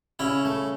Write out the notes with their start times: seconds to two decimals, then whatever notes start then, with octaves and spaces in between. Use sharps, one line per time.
0.19 C#3 C#4 E4
0.45 A3